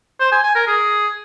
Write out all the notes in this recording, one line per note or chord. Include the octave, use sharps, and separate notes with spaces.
C5
G#5
G#5
A#4
G#4